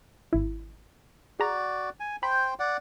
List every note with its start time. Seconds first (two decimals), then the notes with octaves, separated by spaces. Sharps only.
0.33 G#1 E4
1.40 F#4 G#4 D5 A#5
2.00 G#5
2.23 C5 G5 B5
2.59 D5 F#5